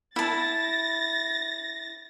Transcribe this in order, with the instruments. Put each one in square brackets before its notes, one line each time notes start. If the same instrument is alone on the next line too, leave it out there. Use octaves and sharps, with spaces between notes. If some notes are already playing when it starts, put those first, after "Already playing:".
[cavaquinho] E4 A5 [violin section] A6 A#6